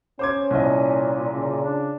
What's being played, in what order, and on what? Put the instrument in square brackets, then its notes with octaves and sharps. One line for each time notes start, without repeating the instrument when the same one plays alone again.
[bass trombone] C#4 [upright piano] C5 D6 G#6
[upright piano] C2 D#5 [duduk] A#2
[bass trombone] C#3
[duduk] D4